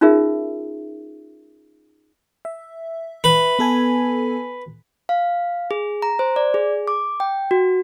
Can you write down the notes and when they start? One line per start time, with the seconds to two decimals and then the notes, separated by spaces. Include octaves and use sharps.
0.01 C#4 D#4 F4 G#4 A#4 E5
2.45 E5
3.24 B4
3.59 B3 A4 G#5
5.09 F5
5.71 G#4
6.02 A#5
6.19 C5
6.36 D5
6.54 G#4
6.88 D6
7.20 G5
7.51 F#4